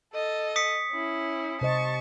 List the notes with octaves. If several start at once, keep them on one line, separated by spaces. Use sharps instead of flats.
A4 D#5
D#6 B6 C#7
C#4 E4
C3 C5 D#5 A5 C#6